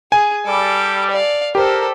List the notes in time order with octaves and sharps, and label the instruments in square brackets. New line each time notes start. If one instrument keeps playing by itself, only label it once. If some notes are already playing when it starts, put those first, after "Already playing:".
[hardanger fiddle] G#4 [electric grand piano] G#5
[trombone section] G3 [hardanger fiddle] A4 D6
[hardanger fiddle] D5 F5
[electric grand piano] G4 [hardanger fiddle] A4 C5 [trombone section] A#4